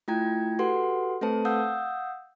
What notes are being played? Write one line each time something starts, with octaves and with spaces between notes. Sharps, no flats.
A3 E4 F4 G5 A#5 G#6
F#4 G4 A4 B4 F#5 C6
A3 C4 A4 B4 C5 A5
F5 F#5 D#6 E6 G6